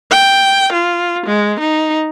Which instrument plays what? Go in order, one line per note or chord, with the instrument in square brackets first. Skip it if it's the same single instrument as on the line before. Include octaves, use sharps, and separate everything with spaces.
[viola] G5
F4
G#3
D#4